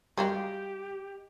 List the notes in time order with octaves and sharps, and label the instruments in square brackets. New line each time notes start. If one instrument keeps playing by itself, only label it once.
[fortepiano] G3 [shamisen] G#3 F#4 F5 [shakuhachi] G4